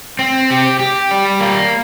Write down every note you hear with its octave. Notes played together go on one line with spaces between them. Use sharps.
C4
G4
G4
G3
A#3